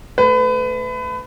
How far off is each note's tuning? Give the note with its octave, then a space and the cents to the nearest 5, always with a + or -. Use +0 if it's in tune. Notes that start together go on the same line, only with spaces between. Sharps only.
A3 +0 B4 +30